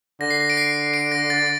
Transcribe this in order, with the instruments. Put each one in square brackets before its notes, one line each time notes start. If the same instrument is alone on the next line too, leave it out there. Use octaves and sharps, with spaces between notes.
[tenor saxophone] D3 [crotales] A#6
[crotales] C7
A#6
D7
C7
D7
A#6
A6